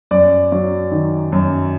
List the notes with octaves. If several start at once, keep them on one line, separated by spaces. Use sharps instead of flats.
F#2 D5
F#3
D#3
F#2